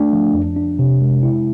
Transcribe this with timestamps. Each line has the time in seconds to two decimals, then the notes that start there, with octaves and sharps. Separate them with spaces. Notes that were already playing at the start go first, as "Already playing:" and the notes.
Already playing: A3 D4
0.13 F3
0.34 F2
0.56 D4
0.79 C3
1.01 G#3
1.23 E4